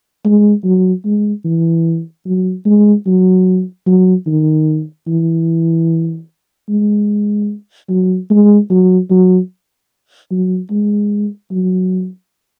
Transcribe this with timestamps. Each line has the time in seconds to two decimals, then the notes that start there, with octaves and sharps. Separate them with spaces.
0.25 G#3
0.64 F#3
1.05 G#3
1.44 E3
2.26 F#3
2.65 G#3
3.06 F#3
3.86 F#3
4.26 D#3
5.07 E3
6.69 G#3
7.89 F#3
8.30 G#3
8.70 F#3
9.10 F#3
10.31 F#3
10.71 G#3
11.52 F#3